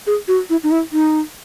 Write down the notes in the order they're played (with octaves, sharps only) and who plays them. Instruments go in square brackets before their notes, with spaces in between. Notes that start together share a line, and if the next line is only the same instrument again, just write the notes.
[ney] G#4
F#4
E4
D#4
E4
D#4